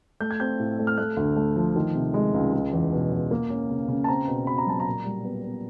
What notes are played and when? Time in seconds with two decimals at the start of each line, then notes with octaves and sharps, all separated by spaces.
0.20 A3 G6
0.31 G#6
0.40 C4 G6
0.59 A2
0.79 A3
0.87 F6
0.97 A3 F#6
1.17 D2
1.36 A3
1.56 F3
1.76 D#3
1.95 C3
2.14 G#3
2.34 C#2
2.53 G#3
2.73 E2
2.93 B2
3.12 E2
3.31 A#3
3.50 C#4
3.70 C#3
3.88 C#3
4.04 A5
4.08 C4 A#5
4.28 B2
4.47 B2 B5
4.58 A#5
4.66 F#3 A5
4.80 A#5
4.86 A#2
5.05 G3
5.25 B3
5.44 B3